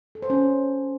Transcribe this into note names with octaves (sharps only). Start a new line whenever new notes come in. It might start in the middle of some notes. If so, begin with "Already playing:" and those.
A4
C5
C#4